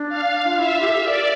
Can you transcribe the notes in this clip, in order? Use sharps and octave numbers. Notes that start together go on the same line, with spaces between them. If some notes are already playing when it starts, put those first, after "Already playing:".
Already playing: D4
F5
F4
E4 E5
F4
G4
A4
G4
A#4 D5